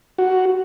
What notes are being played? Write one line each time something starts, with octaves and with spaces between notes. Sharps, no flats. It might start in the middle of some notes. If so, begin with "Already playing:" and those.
F#4